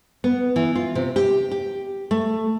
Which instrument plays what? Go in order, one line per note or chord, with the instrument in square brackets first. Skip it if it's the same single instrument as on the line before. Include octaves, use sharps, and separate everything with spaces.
[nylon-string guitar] B3
E3
F4
C3
G4
G4
A3